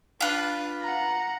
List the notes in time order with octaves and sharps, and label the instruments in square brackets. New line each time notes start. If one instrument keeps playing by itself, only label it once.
[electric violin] D4 [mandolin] F4 B4
[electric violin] F#5 A#5